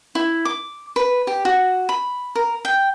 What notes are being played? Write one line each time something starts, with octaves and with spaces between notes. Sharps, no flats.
E4
D6
B4
G4
F#4
B5
A#4
G5